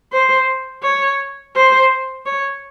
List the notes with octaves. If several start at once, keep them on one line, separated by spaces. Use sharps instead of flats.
C5
C#5
C5
C#5